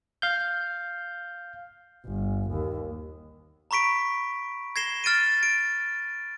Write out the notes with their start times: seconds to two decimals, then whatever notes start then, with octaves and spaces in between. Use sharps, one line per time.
0.22 F5 G6
2.05 G1
2.50 D#2
3.71 A#5 B5 C#6 B6 D7
4.76 G#6 A#6 C7 E7 G7
5.04 F6 A6 D7 D#7
5.43 D7